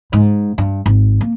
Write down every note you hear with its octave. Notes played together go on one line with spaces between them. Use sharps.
G#2
G2
G#1
A#3